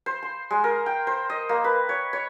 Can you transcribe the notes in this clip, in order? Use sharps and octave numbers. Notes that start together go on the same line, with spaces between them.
C5
C6
G#3
A#4
G5
C5
D#5
A#3
B4
C#5
C#5